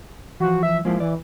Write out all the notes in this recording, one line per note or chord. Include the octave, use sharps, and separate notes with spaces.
E3 F3 F#4
E5
F3 G#3 A#3 E4
E3 D5